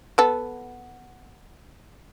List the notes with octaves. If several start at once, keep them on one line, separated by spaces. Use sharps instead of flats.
B3 A4